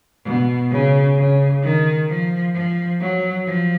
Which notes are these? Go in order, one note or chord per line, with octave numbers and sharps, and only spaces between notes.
B2
C#3
C#3
D#3
F3
F3
F#3
F3